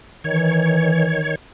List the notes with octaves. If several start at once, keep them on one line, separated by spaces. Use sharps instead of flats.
D#3 E3 C#5